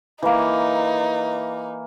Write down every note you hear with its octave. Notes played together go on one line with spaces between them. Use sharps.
E3 A#3 D#4